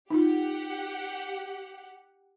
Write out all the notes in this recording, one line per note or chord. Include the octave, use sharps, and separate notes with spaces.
D#4 F4 G4 F#5